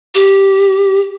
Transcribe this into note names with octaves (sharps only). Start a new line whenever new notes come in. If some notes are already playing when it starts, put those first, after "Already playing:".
G4